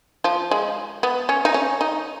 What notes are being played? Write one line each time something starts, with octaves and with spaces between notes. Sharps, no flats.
F3
G#3
B3
C#4
D#4
C#4
D#4